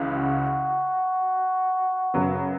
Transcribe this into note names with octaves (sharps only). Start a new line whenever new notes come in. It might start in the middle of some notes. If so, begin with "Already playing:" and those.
Already playing: C#2 C#3 E3
F#4
F#2 C#3 F#3 B3